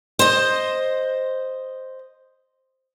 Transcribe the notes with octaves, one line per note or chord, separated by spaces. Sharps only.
C5 D#5